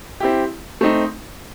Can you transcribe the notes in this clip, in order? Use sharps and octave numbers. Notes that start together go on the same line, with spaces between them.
C4 E4 G4
A3 C4 D#4